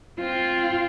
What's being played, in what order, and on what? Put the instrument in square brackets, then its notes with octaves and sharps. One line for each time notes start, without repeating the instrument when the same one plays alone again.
[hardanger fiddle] C4 [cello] F4